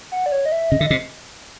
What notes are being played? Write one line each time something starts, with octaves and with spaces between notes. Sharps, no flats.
F#5
D5
C#5
D#5
E5
C#3 D#5
D3 E5
D#5
C3